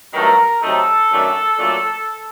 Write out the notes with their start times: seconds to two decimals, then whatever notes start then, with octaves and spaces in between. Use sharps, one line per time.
0.13 G2 D#3 F#3 A3 A#4
0.61 C3 F#3 A3 D#4 A4
1.09 F#2 D#3 A3 D4
1.58 A#2 F#3 A3 D4